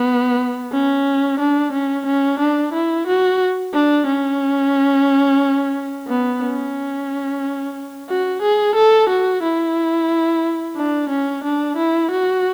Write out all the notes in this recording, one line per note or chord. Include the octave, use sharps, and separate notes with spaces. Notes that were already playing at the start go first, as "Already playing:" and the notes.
Already playing: B3
C#4
D4
C#4
C#4
D4
E4
F#4
D4
C#4
B3
C#4
F#4
G#4
A4
F#4
E4
D4
C#4
D4
E4
F#4